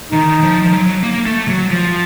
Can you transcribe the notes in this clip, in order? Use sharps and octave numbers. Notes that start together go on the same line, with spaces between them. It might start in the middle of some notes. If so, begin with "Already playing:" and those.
D#3 D#4
F3
F3
F#3
A#3
A3
F#3
F3